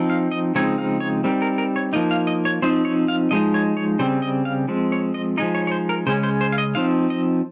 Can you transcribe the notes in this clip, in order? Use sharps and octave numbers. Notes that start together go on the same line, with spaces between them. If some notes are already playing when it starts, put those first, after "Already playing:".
Already playing: F3 C4 D#4
F5
D#5
C#3 F3 G#3 C4 D#4 C#5
F5
C#5
G3 C4 D#4 A#4
A#4
A#4
C#5
F3 A#3 D#4 D#5
F5
D#5
C#5
F3 C4 D#4 C5
C#5
F5
F3 G#3 D#4 D#5
C#5
C#5
C#3 G3 C4 C5
D#5
F5
F3 G#3 C4
C#5
D#5
F3 G#3 D#4 D#5
C#5
C#5
C5
A#4
C#3 G#3 C#4 C5
C5
C5
F5
D#5
F3 C4 D#4 F5
D#5